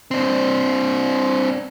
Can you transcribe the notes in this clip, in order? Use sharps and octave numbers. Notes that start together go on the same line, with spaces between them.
C4 D4